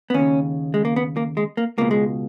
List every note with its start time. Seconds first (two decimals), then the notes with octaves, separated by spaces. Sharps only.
0.10 B3
0.14 D#2 C#3 C#4
0.74 G#3
0.85 A#3
0.96 B3
1.17 A#3
1.37 G#3
1.57 A#3
1.78 C#2 B2 A#3
1.91 G#3